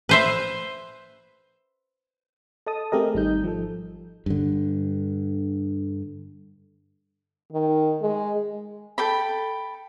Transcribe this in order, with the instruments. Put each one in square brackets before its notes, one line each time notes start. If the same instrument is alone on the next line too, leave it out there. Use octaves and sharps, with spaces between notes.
[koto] B4 C5 E5
[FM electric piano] A4 D#5 A5 D#6
A3 C4 G4 G#4 A#4 D#5
G#1 G3 D#4 G6
F3 A4
[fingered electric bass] G2 D3
[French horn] D#3
G#3
[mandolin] A4 G5 B5